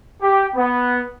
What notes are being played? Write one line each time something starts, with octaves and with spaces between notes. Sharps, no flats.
G4
B3